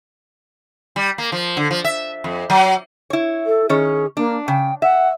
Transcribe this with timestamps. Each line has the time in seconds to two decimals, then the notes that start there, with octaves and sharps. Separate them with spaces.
0.96 G3
1.18 A#3
1.32 F3
1.57 D3
1.71 F3
1.84 E5
2.24 F2
2.50 F#3
3.10 E4 C#5
3.46 A4
3.69 D#3 C#4 G#4 C#5
4.17 A#3 D4
4.48 C#3 G5
4.82 E5 F#5